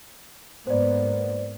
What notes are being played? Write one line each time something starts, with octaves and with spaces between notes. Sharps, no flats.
G#2 A#3 B3 C5 D5